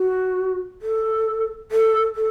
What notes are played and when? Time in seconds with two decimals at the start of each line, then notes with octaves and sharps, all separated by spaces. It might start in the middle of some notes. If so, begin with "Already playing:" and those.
Already playing: F#4
0.82 A4
1.71 A4
2.15 A4